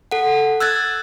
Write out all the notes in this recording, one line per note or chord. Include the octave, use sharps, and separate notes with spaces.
A4 F#5
E6 F#6 G#6 A6